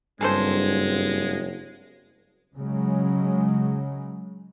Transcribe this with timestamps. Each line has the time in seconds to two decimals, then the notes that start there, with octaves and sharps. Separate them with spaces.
0.21 F#1 G2 G#3 C4 G#4 A4 C5
2.56 C#3 F#3 G#3